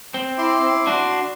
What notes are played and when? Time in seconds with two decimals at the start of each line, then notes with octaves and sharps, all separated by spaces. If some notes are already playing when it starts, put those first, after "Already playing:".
0.14 C4
0.38 E4 C6 D6
0.87 D4 F#4 C6